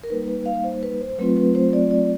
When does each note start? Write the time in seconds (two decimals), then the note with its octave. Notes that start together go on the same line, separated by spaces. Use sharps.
0.03 A#4
0.10 G3 A#3 D#4 B4
0.28 B4
0.46 F5
0.64 C5
0.83 B4
1.01 C5
1.18 F#3 A3 C4 F4 B4
1.37 B4
1.55 C5
1.73 D5
1.91 D5